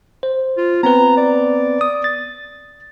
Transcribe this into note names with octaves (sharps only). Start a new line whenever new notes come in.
C5
F4
B3 C4 B4 A#5
D5
D#6
A6